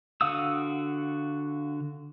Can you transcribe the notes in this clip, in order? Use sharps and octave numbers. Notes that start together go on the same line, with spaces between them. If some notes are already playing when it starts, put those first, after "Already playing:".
D3 F#4 F5 D#6 E6